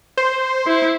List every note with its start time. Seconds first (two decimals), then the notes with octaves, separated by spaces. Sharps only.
0.17 C5
0.67 E4